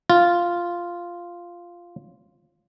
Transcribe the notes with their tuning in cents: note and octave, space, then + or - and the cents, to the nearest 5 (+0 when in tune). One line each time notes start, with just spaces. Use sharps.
F4 -5